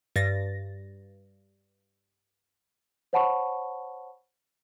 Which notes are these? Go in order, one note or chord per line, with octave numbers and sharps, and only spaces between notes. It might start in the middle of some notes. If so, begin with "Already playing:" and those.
G2 A6 A#6
C5 C#5 F#5 A5 B5 C#6